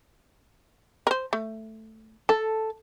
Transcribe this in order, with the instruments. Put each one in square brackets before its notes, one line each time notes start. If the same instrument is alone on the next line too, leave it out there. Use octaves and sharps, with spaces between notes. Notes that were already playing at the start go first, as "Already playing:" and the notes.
[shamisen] A#4 C5
A3
[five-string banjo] A4 [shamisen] A5